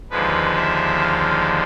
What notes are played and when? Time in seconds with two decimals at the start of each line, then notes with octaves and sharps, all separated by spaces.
0.11 D#2 D3 F3 G#3 B4
0.57 E5
1.01 F5